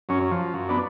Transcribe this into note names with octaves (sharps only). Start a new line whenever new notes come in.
F#2 C#4
F3
F#2
B3 D4